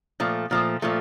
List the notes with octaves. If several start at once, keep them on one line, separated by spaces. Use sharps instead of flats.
A#2 F3 A3
A#2 F3 A3
A#2 F3 A3